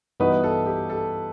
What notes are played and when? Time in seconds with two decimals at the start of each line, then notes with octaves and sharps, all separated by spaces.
0.20 G2 E3 B3 D#4 F#4 B4
0.43 A4
0.66 G4
0.90 A4